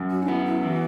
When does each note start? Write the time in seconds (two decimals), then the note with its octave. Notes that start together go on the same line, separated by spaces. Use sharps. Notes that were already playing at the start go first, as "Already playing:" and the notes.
Already playing: F#2
0.11 F#4
0.23 D4
0.28 B3 E4
0.45 E4
0.63 E3 F#4